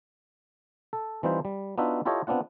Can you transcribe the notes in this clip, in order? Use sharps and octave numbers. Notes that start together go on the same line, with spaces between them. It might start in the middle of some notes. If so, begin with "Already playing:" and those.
A4
E3 G3 C4 D#4 F4 C5
G3
B3 D4 D#4 F4 F#4 E5
E4 F4 G4 A4 C#5 D#5
B3 C4 D4 F4 F#5